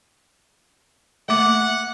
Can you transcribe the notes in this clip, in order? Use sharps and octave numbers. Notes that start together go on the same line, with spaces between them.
A3 A#3 F#5 D6